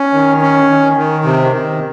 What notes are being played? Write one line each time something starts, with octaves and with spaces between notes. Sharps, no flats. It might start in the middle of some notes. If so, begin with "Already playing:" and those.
Already playing: C#4
D#3
C#4
D#3
D#3
C3
D#3